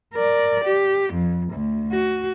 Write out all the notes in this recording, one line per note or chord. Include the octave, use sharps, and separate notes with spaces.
A#4 D5
G4
F2
D2
F#4